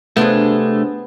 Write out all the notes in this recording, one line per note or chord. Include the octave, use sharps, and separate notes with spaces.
C3 A3 B3 D4 F4 G#4